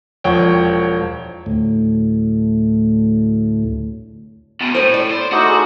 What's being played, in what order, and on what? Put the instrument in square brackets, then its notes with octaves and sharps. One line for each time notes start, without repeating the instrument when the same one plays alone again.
[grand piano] E1 F3 C#5 F#5 G5
[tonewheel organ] D2 A2
[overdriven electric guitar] E2 B2
[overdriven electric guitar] A2 [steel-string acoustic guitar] C5 C#5
[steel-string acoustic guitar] D5
[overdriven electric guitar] C5
[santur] A3 D#4 E5 [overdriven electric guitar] F#4 [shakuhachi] D6
[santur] G#4 A#4 C6